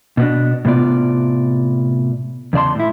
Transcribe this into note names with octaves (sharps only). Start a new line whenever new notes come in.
B2 B3 D4
A2 C3 B3 F4 D5
E2 C#3 D5 A5 C6
A2 E4